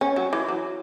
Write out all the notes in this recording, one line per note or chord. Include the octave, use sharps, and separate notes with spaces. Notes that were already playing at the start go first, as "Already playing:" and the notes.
C#4
F#3
E3
F#3